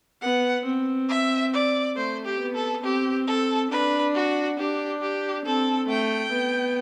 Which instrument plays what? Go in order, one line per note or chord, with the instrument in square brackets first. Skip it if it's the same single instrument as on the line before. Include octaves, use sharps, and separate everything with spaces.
[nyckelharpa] B3 [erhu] F#5
[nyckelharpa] C4
[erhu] E5
D5
[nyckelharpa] A3 [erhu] C5
[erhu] G4
[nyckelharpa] B3
[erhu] A4
[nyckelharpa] C4 [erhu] G4
[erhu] A4
[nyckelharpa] D4 [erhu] B4
[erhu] F#4
[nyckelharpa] D4 [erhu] G4
[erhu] G4
[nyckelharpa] C4 [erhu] A4
[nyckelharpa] A3 [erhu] G5
[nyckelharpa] B3